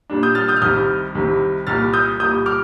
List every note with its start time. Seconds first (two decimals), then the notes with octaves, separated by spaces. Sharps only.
0.10 A#2 G3 D4
0.23 D#6 G6
0.35 F6 A6
0.48 D#6 G6
0.57 F6
0.62 C2 C3 D#3 G3 D#6 G6
1.15 C2 C3 D#3 G3
1.67 C2 A#2 G3 F6 A6
1.93 D#6 G6
2.20 C2 A#2 G3 D#6 G6
2.46 D6 F6